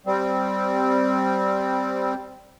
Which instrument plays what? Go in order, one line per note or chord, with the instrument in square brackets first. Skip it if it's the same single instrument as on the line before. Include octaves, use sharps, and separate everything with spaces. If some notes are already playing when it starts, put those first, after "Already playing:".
[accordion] G3 C4